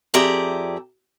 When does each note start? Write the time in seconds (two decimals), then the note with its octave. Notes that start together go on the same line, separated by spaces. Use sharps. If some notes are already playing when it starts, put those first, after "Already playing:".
0.14 F2 G4 G#4 D5 E5 A#5